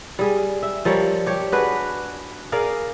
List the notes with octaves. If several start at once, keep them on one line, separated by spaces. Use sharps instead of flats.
G3 G#4
E5
F3 G3 A#4 C#5
G4 C#5
D4 F#4 G#4 B4
G#4 A#4 D5 F5